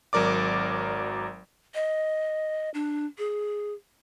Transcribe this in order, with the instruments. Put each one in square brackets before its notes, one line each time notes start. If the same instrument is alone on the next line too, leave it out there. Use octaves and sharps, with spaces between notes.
[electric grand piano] G#1 F#3 A#4 D5 D6
[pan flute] D#5
D4
G#4